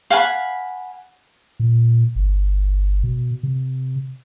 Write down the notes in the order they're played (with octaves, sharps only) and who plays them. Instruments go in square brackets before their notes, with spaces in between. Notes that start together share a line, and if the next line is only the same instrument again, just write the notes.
[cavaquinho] F5 F#5 G#5 B5
[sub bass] A#2
G1
B2
C3